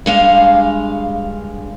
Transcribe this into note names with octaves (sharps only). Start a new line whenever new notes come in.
G2 G#3 F5